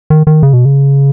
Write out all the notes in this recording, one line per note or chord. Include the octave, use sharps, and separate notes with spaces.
D#3
D#3
C#3
B2
C#3